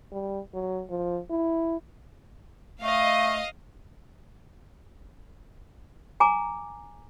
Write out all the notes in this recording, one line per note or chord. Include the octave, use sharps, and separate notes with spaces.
G3
F#3
F3
E4
A3 D#5 F5
G#5 A#5 D6